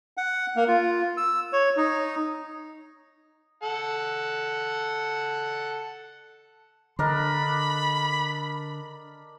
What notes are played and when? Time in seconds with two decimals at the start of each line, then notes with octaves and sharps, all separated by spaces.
0.17 F#5
0.56 A#3
0.68 F4
1.17 E6
1.53 C#5
1.77 D#4
3.63 A4 F#5
6.99 D3 D4 A#4 D#5 B5